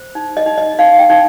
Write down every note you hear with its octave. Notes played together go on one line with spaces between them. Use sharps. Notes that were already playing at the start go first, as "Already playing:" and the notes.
Already playing: C5
D#4
D#5
D#4
D#5
D#4 F5
G5
D#4